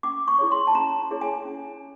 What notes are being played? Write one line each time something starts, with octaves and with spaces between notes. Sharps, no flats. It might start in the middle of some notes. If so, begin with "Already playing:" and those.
C#4 D6
C#6
E4 G#4 C#5
C6
A5
C#4 A#5
E4 G#4 C#5
G#5
C#4